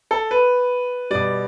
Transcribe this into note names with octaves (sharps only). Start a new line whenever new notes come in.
A4
B4
B2 G3 D5